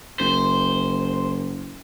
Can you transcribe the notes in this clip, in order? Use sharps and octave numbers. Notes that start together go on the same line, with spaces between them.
F#1 C5